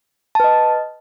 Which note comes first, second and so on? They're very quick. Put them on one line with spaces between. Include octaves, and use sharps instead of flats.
A5 B4 D#5